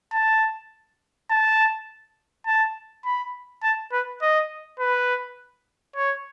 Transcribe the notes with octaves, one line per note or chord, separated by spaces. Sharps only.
A5
A5
A5
B5
A5
B4
D#5
B4
C#5